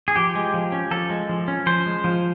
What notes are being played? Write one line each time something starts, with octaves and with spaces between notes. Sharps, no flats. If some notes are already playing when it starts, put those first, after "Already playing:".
G#4
F3 G4
G#3
F3
C#4
F3 A4
G#3
F3
C#4
F3 C5
G#3
F3